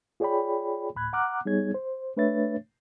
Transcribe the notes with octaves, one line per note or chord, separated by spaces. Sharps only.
F4 G#4 C#5 D5 G5 B5
D2 A2 B5 F#6 G#6
F#5 A#5 D6 F6 F#6
G3 B3 D#4 G#4 C#5 G#6
C5
A3 D4 B4 C#5 E5 A6